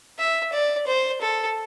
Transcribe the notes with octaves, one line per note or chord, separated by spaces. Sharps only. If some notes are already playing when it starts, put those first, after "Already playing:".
E5
D5
C5
A4